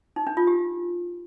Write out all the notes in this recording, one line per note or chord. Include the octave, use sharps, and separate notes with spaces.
D#4
D4
F4
G4